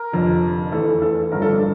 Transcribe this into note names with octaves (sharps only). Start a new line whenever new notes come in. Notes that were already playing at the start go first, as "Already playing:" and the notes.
Already playing: A#4
F1 F2 D3
E2 E3 A3 A4
A4
A1 G2 D3 F3 A#4
A4
D4